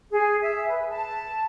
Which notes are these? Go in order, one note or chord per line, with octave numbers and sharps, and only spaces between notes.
G#4
E5
B4
A5